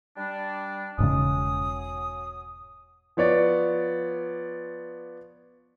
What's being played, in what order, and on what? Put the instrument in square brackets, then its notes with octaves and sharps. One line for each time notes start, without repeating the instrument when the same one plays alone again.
[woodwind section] G3 D4
[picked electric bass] E1 G#2 C#3 [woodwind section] F#3 G#5 D#6
[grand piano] F3 B3 C#5 D5